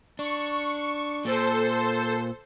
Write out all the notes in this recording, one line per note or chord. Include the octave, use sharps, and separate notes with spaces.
D4 C#6
A#2 A4 C5